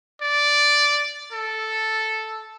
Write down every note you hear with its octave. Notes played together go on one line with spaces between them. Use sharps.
D5
A4